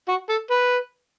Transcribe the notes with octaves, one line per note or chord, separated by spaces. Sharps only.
F#4
A4
B4